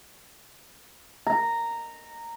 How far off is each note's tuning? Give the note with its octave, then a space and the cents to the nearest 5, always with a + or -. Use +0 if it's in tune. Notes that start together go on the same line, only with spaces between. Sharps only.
A#5 -10